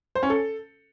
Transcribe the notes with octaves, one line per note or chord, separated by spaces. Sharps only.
C5
C#4
A4